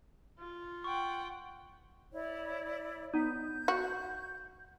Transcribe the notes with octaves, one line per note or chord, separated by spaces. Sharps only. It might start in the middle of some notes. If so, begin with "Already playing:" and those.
F4
F#5 G5 C#6
E4 C#5 D5
B3 D#4 G6
F#4